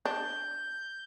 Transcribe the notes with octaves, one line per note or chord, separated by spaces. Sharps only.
D4 G6